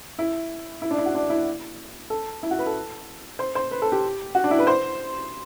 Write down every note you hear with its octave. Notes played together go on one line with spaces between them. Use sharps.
E4
E4
D4
E4
F#4
D4
E4
A4
E4
F#4
B4
A4
C5
C5
B4
A4
G4
F#4
D4
E4
B4
C5